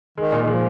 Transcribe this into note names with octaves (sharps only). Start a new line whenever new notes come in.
D#3 G#3
A#2
D#3
F3 G#3